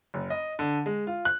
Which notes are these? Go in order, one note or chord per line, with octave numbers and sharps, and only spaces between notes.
F#1
D#5
D3
G#3
F4
F#6